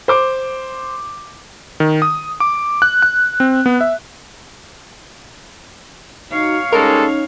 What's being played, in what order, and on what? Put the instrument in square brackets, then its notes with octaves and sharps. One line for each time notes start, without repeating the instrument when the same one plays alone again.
[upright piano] C5 D6
[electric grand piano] D#3
D#6
D6
F#6
F#6
C4
B3
E5
[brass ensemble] D#4 F#4 [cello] C#5 F5
[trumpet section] G3 G#3 A4 [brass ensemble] C#4 D#4 [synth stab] A#4